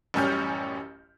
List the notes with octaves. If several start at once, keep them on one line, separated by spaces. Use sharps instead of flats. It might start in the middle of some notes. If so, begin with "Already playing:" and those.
A1 F#2 G3 C#4 F6 G6